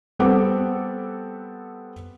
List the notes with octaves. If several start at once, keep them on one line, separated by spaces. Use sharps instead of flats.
G3 B3 C4 A4 F#5 D6